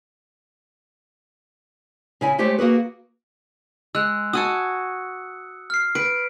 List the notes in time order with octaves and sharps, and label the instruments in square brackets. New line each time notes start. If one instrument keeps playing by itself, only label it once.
[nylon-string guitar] C#3 E4 G#5
G#3 A3 G4 C5 C#5 E5
A#3 F#4 G#4 B4
[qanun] G#3 [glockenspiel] E6 F#6
[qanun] F#4 G#5 A5 [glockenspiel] D#6 E6 C#7
[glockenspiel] F6 C7
[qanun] B4 [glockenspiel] D7